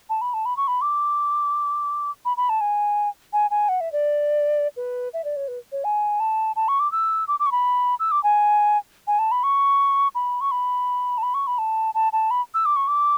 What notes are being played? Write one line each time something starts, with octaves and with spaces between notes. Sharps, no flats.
A5
B5
A5
B5
C#6
B5
D6
B5
B5
A5
G#5
G#5
G#5
F#5
E5
D5
B4
E5
D5
C#5
B4
C#5
G#5
A5
A5
C#6
D6
E6
D6
D6
C#6
B5
E6
D6
G#5
G#5
A5
B5
C#6
B5
C#6
B5
A5
B5
C#6
B5
A5
A5
A5
B5
E6
D6
C#6
D6